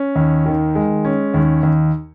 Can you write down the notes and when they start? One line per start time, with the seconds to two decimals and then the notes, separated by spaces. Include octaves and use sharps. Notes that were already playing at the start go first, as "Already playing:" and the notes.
Already playing: C#4
0.16 D#2
0.46 D#3
0.75 G#3
1.05 C#4
1.34 D#2
1.63 D#2